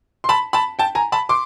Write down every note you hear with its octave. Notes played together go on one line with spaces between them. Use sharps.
C6
A5 B5
A5 B5
G5 A5
G#5 A#5
A5 B5
C6 D6